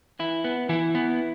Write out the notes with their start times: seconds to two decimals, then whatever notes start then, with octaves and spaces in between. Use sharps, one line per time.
0.19 E3 E4
0.44 B3
0.69 E3 E4
0.95 B3